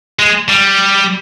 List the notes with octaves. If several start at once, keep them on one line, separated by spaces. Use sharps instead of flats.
G#3
G3